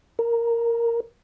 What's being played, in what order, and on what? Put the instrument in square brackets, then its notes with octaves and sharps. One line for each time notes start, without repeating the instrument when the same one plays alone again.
[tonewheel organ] A#4